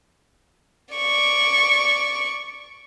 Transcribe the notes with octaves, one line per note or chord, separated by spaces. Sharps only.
D5 C#6